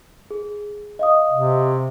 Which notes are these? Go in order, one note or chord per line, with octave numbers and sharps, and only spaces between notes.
G#4
D#5 F5 D#6
C3